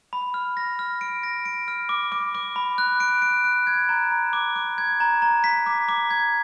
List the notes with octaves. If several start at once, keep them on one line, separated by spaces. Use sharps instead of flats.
B5
F6
A#6
F6
D7
A#6
D7
F6
D6
D6
D6
B5
F#6
D7
D7
F#6
G#6
A#5
A#5
D6
D6
G#6
A#5
A#5
B6
D6
D6
G#6